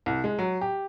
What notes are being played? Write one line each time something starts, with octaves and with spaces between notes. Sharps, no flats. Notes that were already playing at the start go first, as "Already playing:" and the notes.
C2
G#3
F#3
G4